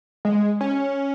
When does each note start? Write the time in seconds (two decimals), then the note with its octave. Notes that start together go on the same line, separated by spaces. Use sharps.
0.25 G#3
0.61 C#4